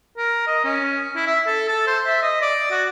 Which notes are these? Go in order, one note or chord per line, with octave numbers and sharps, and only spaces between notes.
A#4
D#5
C#4
E4
E5
A4
A4
C5
E5
D#5
D5
F#4